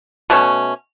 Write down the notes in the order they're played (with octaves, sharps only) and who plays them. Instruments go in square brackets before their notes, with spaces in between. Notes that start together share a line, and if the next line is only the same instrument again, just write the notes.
[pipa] B2 A3 C#4